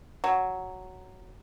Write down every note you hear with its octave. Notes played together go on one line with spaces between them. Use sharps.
F#3